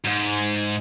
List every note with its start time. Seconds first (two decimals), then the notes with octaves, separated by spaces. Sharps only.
0.04 G#2